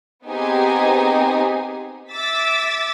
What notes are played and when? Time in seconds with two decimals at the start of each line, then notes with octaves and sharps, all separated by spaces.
0.24 B3 C4 D#4 G4 G#4 G#5
2.11 E5 D6 E6 A6 B6